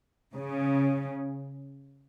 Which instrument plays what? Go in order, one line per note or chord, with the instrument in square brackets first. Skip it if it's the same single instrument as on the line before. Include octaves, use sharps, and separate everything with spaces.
[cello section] C#3